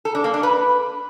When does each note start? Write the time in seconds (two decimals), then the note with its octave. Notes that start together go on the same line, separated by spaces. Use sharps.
0.05 A4
0.15 D4
0.24 A#3
0.34 D4
0.43 B4